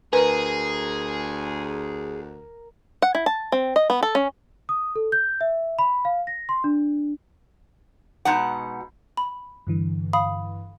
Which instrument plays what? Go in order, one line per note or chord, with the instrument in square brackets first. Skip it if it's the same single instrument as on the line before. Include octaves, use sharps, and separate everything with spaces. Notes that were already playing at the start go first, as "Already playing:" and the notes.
[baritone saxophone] D2 [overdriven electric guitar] G#4 [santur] A#4 [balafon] B4
[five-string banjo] F#5
E4
A5
C4
D#5
B3
A4
C#4
[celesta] D#6
A4
G6
E5
B5
F5
A#6
C6
D4
[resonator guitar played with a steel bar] B2 G#3 D#4 F#5
[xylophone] B5
[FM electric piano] G2 D3 E3
[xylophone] F5 B5 D#6